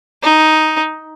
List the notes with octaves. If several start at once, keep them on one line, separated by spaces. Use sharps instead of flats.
D#4